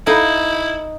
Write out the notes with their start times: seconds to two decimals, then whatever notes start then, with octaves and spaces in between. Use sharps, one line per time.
0.07 D#4 E4 A4 F5 B5